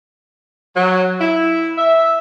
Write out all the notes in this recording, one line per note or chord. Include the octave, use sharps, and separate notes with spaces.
F#3
E4
E5